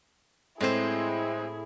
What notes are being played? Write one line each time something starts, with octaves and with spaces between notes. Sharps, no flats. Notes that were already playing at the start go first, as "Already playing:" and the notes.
A2 G#3 C4 E4 G#4 C5